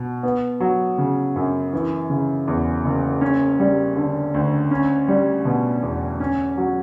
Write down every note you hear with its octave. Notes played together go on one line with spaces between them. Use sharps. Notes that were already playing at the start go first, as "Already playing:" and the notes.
Already playing: B2
B3
F#3
C#3
F#2
E3
C#3
E2
F#1
C#4
G3
D3
D2
C#4
G3
B2
E2
C#4
F#3